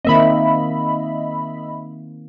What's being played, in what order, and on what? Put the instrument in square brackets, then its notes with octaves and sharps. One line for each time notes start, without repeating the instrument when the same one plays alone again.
[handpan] D#3 A#3 C4 [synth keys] D#5 E5 B5